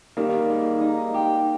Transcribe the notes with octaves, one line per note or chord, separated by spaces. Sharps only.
D#3 G3 A#3
G#3
D#4
G4